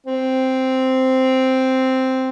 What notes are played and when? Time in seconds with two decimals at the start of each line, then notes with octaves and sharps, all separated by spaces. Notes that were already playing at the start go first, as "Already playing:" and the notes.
0.07 C4